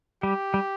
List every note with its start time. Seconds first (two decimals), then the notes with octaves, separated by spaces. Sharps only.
0.22 G3 G4
0.54 G3